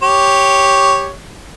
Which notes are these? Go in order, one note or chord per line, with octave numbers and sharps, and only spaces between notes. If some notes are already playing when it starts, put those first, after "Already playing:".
G4 C#5